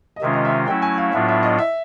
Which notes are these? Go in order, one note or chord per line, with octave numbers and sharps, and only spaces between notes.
D#5
C3 D#3 G#3 C#4 F4 E5
D#5
E5
F#3 A3 C#4 E4 G5
G#5
F5
A2 F#3 B3 D4 F4 E5
E5
D#5
E5